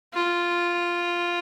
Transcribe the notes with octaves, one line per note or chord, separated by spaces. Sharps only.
F4